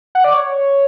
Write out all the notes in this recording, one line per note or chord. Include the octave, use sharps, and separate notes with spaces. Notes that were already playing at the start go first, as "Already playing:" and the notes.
F#5
D5
C#5